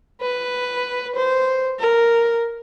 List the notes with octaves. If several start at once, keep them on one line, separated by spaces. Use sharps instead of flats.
B4
C5
A#4